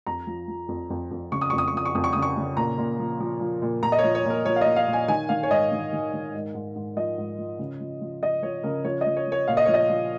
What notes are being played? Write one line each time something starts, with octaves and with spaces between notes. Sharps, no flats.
F2 A#5
F3
F3
F2
F2
F2
C#3 C#6
D#6
F2 C#6
D#6
C#6
F3 D#6
C#6
F2 D#6
C#6
C#3 D#6
C#6
C#3
A#2 A#5
A#2
F3
F3
F3
A#2
A#2 A#5
D#5
C#5
F3
C#5
A#2
A#4
F3 C#5
F5
A#2 D#5
F5
A#2
G#5
D#3 G#5
D#3 F5
C#5
G#2 D#5
D#3
D#3
D#3
G#2
G#2
G#2
F3 D#5
G#2
F3
C#3
F3
F3
F3 D#5
F3 C#5
C#3 A#4
F3 C#5
D#5
F3
C#5
F3 C#5
A#2 F5
D#5
F3 C#5
D#5
F3